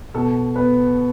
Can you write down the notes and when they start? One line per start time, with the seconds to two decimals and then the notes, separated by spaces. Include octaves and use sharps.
0.14 B2 A4
0.55 B3 B4